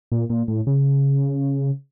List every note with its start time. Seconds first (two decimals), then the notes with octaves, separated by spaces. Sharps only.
0.12 A#2
0.30 A#2
0.48 A2
0.67 C#3